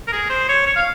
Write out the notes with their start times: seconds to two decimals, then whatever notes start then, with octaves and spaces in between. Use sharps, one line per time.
0.07 A#4
0.12 G#4
0.30 C5
0.49 C#5
0.66 C#5
0.76 F5